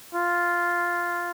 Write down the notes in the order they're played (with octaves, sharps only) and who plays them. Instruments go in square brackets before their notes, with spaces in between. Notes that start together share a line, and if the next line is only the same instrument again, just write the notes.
[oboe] F4